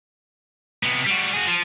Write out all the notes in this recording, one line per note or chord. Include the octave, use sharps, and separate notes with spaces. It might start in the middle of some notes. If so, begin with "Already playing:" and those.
C3 B3
G3 F#4
F#4 G#4
F3